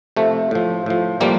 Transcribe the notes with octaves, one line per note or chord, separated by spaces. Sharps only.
C3 F3 A3
A2 F3
A2 F3
A2 F3 G3 A#3